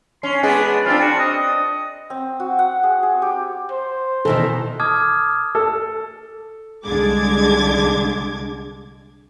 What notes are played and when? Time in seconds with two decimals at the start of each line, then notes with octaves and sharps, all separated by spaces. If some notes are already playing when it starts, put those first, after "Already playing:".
0.23 C#4 C6
0.43 G#3 B3 D4 G#4
0.86 C4 D4 F4
1.01 F#4
1.19 D#5
2.10 C4
2.40 F#4
2.59 F#5
2.83 G#4
3.03 G#4
3.22 G4
3.71 C5
4.25 B2 D#3 E3 A4
4.80 A5 D6 D#6 F6 G#6
5.55 A4
6.86 C2 D3 G#3 D6 G#6